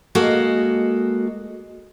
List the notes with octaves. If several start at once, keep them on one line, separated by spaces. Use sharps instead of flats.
G#3 A#3 F#4 A4 D#5